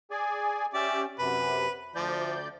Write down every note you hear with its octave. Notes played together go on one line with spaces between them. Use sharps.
G#4 D5 G#5
C#4 G4 D5 E5
F#2 C3 B4
D2 F3 D5 G6